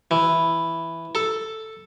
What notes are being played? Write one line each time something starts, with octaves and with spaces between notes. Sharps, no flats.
E3
A4